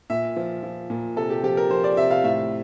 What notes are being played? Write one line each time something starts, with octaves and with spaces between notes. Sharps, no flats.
A#2 E5
F3
F3
A#2
C3 A4
G4
F3 G4
A#4
F3 C5
D5
C3 E5
F5
A2 E5